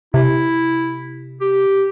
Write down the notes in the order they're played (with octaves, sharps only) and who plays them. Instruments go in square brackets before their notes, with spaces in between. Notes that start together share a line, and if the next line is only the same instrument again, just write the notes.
[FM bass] C3 [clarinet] E4
[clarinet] G4